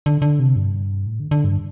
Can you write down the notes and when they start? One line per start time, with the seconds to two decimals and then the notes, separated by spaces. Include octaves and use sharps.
0.06 D3
0.22 D3
0.39 C3
0.56 G2
1.06 A2
1.20 D3
1.31 D3
1.44 G2